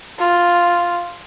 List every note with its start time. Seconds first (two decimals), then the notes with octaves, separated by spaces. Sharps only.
0.19 F4